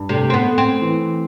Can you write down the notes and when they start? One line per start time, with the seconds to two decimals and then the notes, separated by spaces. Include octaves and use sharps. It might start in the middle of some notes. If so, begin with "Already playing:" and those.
Already playing: G2
0.09 C3 A3
0.30 C4
0.34 B3
0.46 A3
0.58 C4
0.82 E3